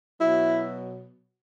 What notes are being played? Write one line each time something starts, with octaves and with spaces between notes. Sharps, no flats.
B2 F#3 E4